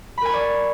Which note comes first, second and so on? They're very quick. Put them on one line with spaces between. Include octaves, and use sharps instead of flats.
B5 A#4 G#5 C#6 D5